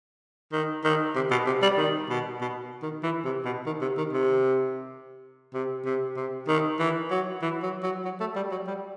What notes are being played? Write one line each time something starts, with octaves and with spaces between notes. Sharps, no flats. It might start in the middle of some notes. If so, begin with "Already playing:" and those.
D#3
D#3
C3
B2
C3
G3
D#3
B2
B2
D#3
E3
C3
B2
D#3
C3
D#3
C3
C3
C3
C3
D#3
E3
F#3
E3
F#3
F#3
F#3
A3
G3
F#3
G3